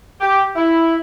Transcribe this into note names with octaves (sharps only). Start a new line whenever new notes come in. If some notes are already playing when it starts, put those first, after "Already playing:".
G4
E4